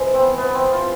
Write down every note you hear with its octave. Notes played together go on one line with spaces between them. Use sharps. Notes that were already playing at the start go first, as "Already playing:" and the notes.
Already playing: C3 E3 G#3
C4
B3
B3
C4
F4